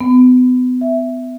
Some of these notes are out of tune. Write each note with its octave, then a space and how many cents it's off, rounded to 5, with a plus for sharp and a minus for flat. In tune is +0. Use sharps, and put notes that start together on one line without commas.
B3 +35
E5 +5